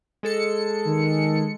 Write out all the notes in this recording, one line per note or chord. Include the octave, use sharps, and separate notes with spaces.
G#3 A4 C#7
D#3